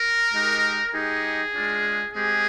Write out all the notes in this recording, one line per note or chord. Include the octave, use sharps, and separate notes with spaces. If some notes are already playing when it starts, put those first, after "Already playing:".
Already playing: A#4
G#3 D#4 G4
G#3 D#4 G4 G#4
G#3 D4 F4
G#3 C4 G4 G#4